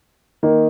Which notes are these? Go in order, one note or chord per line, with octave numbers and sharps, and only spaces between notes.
D#3 A#3 D#4